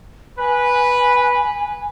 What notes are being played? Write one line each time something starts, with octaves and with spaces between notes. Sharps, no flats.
B4 G#5